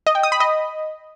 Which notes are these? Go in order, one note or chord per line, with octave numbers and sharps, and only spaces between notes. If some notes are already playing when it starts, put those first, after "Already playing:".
D#5
G5
D#6
B5
D#5